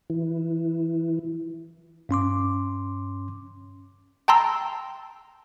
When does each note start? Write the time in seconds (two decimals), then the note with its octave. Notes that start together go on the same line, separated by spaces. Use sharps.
0.10 E3
2.09 G2 C#4 C6 D6
4.28 G5 A5 A#5 C6 E6